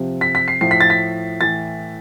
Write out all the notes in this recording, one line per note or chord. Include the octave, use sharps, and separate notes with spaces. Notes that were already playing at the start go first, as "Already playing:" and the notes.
Already playing: C3 F3
B6
B6
C7
A2 F3 C7
B6
A6
B6
A2 E3 A6